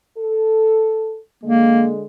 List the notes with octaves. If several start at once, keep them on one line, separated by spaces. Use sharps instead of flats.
A4
D3 G#3 A#3